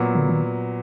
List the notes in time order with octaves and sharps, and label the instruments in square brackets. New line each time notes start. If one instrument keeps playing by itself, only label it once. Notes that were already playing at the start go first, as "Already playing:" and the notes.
Already playing: [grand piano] A#2 F#3 B3
[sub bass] D3
D#3